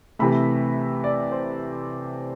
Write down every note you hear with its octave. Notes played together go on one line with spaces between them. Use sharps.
C3 E3 A3 B5
D5
C5